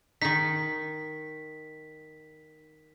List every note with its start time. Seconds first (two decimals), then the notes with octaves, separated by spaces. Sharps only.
0.22 D#3 D#4 B6